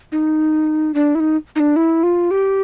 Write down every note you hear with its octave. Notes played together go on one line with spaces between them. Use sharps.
D#4
D4
E4
D#4
D#4
D4
E4
F4
G4